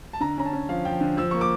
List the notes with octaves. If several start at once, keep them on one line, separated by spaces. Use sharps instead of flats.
A5
D3 A#5
C#4 A#5
A5
C#4
F3 F5
F3 G5
D3
F3 E6
A#3 C#6
D6